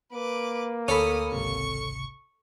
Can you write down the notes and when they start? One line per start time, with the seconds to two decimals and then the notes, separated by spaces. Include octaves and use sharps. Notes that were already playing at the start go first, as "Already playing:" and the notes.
0.13 A#3 B4 D6
0.88 D2 C#4 A4 B5 D#6
1.32 G#1 C#2 C3 C#6 C#7